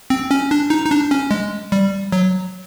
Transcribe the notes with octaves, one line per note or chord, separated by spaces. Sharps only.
C4
C#4
D4
D#4
D#4
D4
C#4
G#3
G3
F#3